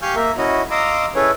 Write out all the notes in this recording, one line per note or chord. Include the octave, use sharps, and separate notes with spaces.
G4 F5 G#5 C#6 F6 G6
A#3 A#4 E5
C#4 E4 F#4 D#5
D#5 F5 A#5 C6 D6 E6
C#4 E4 G#4 A4 B4 C#5